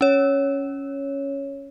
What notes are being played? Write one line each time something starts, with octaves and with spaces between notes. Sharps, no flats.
C#4 C#5